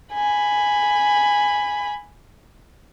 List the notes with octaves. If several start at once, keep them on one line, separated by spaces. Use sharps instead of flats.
G#5 B5